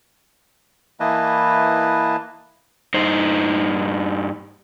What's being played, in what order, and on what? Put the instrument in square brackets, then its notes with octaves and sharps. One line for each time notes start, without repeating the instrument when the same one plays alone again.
[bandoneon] E3 A#3 E4 B4 D#5 A5
[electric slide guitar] G2 D#4 C5